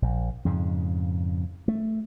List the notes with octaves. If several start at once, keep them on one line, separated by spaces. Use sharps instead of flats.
A#1
F2 G#2 C#3
A3